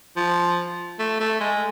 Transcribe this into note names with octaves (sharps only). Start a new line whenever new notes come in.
F3
A3
A3
G#3